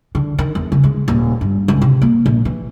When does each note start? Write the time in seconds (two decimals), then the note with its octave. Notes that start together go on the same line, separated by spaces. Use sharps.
0.15 D3
0.39 D#3
0.55 E2
0.72 C#3
0.84 G#3
1.08 D#1
1.41 G2
1.68 C#2
1.82 C3
2.02 A#3
2.26 A#1
2.45 E3